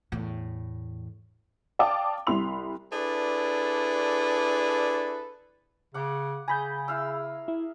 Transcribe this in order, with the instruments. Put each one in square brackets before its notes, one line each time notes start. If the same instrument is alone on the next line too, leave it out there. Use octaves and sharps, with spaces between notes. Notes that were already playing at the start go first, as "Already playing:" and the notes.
[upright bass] E2 A2
[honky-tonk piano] D5 F5 G5 A5 D6 D#6
C2 E4 B5 C6 F7
[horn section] D4 E4 G#4 A4 B4 D5
[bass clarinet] C#3 [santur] F#5 D6
[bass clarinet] C#3 [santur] G#4 A#5 [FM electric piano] G#5 B5 G6
[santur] E4 F5 E6
[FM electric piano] E4